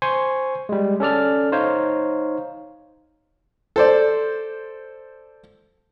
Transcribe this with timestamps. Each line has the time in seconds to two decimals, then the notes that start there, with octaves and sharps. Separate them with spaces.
0.02 C5 G#5 C6 C#6
0.69 G3 G#3
1.00 C#4 A4 D5 F6
1.52 D#4 C5 C#5 F5
3.76 A4 C5 D5